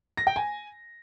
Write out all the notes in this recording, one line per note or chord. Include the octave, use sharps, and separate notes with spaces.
A#6
G5
G#5